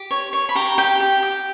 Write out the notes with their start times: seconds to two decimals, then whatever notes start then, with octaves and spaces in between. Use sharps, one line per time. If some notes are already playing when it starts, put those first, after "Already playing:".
Already playing: G4
0.11 C#5
0.33 C#5
0.49 B5
0.55 G4 A#5
0.78 G4 G5
1.00 G4
1.23 G4